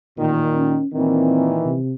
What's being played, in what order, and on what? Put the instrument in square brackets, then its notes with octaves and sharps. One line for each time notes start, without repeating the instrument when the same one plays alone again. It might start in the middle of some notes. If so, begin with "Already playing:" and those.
[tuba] A1 [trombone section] A#2 D#3
[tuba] C#4
[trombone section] A#2 D#3 E3 [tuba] C4
[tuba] C3